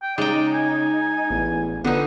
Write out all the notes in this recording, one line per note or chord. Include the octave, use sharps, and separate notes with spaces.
G5
C#3 G#3 D#4 D5 G5
G#5
A1 E2
D3 F3 B3 D#4 F#5